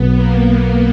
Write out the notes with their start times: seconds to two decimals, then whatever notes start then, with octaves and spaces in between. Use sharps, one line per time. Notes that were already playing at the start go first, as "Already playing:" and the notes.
Already playing: B1 B2 F#3 B3
0.14 A#3
0.44 B3